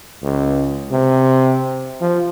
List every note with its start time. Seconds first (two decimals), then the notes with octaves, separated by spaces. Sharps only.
0.22 C#2
0.91 C3
2.01 F3